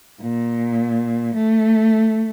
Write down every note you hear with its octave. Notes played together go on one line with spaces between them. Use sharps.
A#2
A3